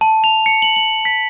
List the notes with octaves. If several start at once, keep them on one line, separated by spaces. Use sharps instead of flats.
A5
F7
C#7
F#7
F#7
B6